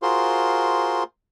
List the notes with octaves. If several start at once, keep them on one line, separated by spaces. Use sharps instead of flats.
F4 F#4 G#4 A#4 C5 C6